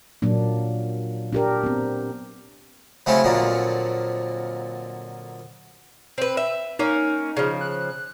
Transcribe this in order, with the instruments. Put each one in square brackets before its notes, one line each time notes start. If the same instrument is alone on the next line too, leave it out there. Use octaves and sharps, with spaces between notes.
[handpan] A#2 F#3 A#3 D4
D4 G4 A#4
B3 C4
[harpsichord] C#3 F#3 A3 C4 C#4 E4
F2 A#2 D3 F#3 A#3
[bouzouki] C4 B4
E5
[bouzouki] A#3 C#4 [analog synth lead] D#4
[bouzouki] C#3 F3
[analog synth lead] F#6